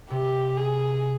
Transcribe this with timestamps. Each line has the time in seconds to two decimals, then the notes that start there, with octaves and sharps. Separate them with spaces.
0.10 C3 G4
0.57 G#4